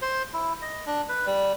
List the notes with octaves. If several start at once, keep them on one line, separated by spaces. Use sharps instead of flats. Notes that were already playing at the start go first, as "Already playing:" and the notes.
C5
E4
D#5
D4
B4
G3